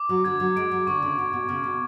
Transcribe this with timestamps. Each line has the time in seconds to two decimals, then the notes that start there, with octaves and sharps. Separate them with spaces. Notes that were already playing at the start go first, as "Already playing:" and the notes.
Already playing: D6
0.09 F#3
0.24 D3 G#6
0.40 F#3
0.56 G#3 D7
0.71 F#3
0.87 D3 C#6
1.02 C#3
1.18 B2 C#6
1.33 B2
1.49 C#3 F6
1.64 B2